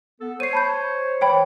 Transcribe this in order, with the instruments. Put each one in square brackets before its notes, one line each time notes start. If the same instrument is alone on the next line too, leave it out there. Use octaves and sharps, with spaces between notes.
[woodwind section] B3 A4
[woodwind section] C5 C#5 [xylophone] C7 D#7
[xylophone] A5 B5 G6
[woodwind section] E3 [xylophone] C#5 G5 B5